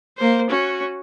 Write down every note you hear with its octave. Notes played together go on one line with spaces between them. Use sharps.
A#3 C5
C#4 F#4